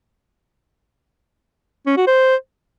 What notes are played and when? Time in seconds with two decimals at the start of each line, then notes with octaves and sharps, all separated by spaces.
1.86 C#4
1.97 F#4
2.07 C5